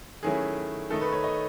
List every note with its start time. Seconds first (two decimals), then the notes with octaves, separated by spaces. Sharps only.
0.23 D#3 F#3 A3 C#4 E4 G#4
0.90 D#3 A3 D#4 A4
1.01 B4
1.12 C#5
1.24 D#5